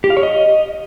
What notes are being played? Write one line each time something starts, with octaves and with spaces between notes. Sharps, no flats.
G4
F5
C#5
D#5